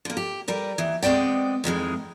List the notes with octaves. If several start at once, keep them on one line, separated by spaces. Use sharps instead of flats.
D3 A#3
G4
G3 A#4 B4
D#2 E3
G#3 B3 C4 D5 G5
F2 D#3 E3 G#3